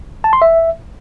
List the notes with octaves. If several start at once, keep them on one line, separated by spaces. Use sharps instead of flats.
A5
C6
E5